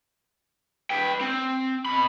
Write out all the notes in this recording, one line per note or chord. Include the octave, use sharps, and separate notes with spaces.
B4 G5
C4
B2 B5